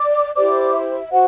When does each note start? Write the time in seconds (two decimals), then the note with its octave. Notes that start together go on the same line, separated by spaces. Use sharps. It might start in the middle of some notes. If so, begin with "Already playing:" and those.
Already playing: D5 D6
0.36 E4 G4 C5 D5 D6
0.74 E5
1.12 F#4 C5 F#5